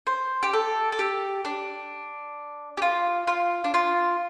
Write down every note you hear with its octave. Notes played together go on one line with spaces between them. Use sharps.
C5
G4
A4
A4
G4
D4
G4
F4
F4
D4
F4